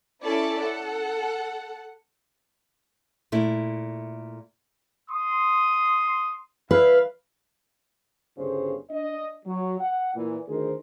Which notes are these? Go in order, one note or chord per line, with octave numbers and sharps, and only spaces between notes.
C#4 E4 A4 D5 A5
A4 F#5
A#2 A3 E4
C6 D#6
E4 B4 F5
G1 C#3 C5
D4 D#5
F#3
F#5
A#2 E3
D2 D#3 G#4 A#4 C5